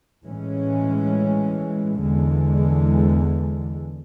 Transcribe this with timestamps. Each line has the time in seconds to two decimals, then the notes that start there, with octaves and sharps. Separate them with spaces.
0.23 A2 E3 G#3 C#4
2.01 E2 D3 G#3